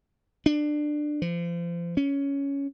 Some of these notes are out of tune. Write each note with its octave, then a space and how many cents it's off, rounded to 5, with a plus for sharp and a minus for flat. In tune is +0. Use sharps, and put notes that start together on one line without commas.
D4 +20
F3 -35
C#4 +10